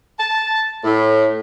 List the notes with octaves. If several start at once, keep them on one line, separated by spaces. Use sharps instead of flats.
A5
A2